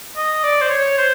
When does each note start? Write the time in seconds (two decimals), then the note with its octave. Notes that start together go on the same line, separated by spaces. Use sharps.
0.17 D#5
0.44 D5
0.61 C5
0.70 C#5
0.98 C5